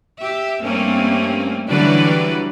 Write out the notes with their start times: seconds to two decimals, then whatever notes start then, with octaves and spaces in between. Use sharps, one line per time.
0.18 G4 E5
0.60 G2 G3 A3 A#3 C4 C#4
1.68 D3 E3 F#3 G3 B4 D5